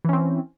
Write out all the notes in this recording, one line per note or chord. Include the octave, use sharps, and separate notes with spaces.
E3 C4 C#4